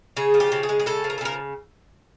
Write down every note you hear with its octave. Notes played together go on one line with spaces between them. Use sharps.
C#3 G#4
F3
G4
C#3
G#4
G#3
G#4
C#3 A4
F3
A#4
A4
C#3 A#4